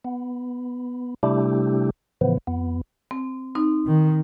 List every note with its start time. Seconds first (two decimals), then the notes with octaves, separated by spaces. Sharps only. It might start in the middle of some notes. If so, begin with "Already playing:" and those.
0.05 B3
1.23 C3 G3 A3 D4 E4 G4
2.21 A2 C#3 E3 F3 B3
2.47 F2 B3
3.11 C4
3.55 C4 D#4
3.86 D#3